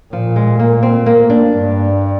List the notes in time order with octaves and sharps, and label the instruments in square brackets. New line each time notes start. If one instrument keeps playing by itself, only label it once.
[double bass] A#2 [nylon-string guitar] F3
[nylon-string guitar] G#3
A#3
C4
A#3
D4
[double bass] G2